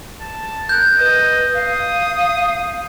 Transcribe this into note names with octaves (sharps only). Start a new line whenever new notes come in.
A5
A#4 F#6 G6
B4 D#5
F5 D#6